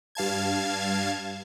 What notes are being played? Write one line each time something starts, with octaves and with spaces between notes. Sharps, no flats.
G2 F5 A5 G#6